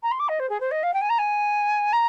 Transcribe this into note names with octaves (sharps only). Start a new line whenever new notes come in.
A#5
C6
D6
D#5
C5
G#4
C5
D#5
F5
G5
G#5
A#5
G#5
A#5